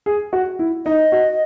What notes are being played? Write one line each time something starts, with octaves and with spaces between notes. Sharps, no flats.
G#4
F#4
E4
D#4 D#5
F#4